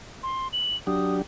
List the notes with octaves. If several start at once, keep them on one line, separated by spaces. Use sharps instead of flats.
C6
F#7
F#3 D4 G4 D#6